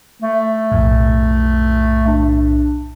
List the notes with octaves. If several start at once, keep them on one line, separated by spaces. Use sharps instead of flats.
A3
B1 F2 A2
D4